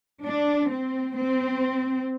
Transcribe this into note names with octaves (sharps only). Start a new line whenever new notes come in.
D4
C4
C4